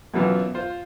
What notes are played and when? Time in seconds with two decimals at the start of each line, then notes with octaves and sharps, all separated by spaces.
0.14 F#2 B2 E3 F#3 B3 F4
0.54 F4 C5